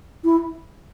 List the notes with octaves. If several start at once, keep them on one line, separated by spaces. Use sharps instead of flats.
E4